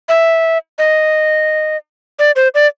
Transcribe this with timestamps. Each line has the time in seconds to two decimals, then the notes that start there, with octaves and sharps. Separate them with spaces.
0.09 E5
0.79 D#5
2.19 D5
2.36 C5
2.55 D5